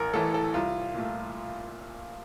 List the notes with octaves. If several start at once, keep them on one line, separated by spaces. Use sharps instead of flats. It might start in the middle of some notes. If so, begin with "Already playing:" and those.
Already playing: A1 A#4
A2 E3 A3 A4
A4
C2 F4
A#2 A3